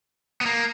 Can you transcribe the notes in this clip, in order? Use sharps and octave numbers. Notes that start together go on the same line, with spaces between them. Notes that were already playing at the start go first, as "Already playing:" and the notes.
B3
A#3